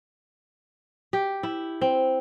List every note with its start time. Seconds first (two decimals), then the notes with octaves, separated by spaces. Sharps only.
1.13 G4
1.43 E4
1.81 C4